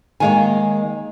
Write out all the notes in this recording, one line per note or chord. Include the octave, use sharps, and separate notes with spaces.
D#3 G#3 A#3 C#5 F5 G#5